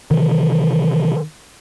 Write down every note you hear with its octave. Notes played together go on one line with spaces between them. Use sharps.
C3 D#3 E3